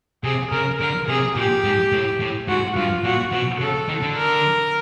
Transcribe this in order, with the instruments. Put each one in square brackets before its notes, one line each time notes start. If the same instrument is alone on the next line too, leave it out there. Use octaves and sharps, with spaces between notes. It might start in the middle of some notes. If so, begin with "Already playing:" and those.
[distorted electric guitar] C3 [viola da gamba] G#4
[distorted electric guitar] C#3 [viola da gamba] A#4
[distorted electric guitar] D3 [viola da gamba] A#4
[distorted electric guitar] C3 [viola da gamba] G#4
[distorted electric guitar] A#2 [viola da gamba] G4
[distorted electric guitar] G#2
A2
A2
[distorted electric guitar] G#2 [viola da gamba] F#4
[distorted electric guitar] G2 [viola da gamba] F4
[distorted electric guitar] A#2 [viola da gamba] F#4
[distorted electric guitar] B2 [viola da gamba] F#4
[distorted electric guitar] C#3 [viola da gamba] A4
[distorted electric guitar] D#3
D3
[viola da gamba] A#4